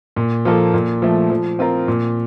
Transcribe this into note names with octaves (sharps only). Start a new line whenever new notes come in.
A#2
F3 A#3 F4 A4
A#2
F3 A3
F3
C4 F4 A#4
A#2